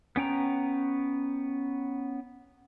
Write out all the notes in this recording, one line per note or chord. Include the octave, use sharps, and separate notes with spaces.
B3 C#4 G5 A#5